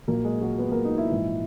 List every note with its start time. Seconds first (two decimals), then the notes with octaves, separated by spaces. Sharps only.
0.08 A#1 A#2 F#3 A#3 A#4
0.24 G#3 G#4
0.41 F#3 F#4
0.58 B3 B4
0.72 A#3 A#4
0.85 D#4
0.98 E4
1.10 A#1 G#2 E3